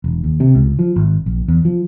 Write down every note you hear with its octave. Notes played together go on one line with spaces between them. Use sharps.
E1
D#2
C3
C#2
F3
G#1
A#1
E2
F3